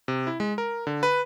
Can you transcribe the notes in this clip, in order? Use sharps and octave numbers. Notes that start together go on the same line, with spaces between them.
C3
E4
G#3
A#4
D3
B4